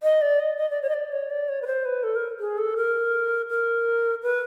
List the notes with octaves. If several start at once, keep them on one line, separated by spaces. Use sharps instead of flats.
D#5
D5
D#5
D#5
D5
C#5
D#5
D5
C#5
D5
C#5
B4
C5
B4
A4
A#4
G#4
A4
A#4
A#4
B4